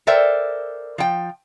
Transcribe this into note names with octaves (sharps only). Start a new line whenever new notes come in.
A4 A#4 C5 D5 E5 G5
F3 G5